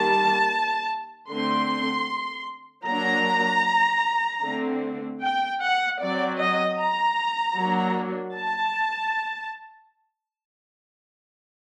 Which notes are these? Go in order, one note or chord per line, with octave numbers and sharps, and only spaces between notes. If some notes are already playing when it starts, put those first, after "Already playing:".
Already playing: D#3 G3 A#3 A5
D3 A3 C4 C6
F#3 A#3 D4 A#5
D3 A3 C4
G5
F#5
F#3 C4 D5
D#5
A#5
F#3 A#3 D4
A5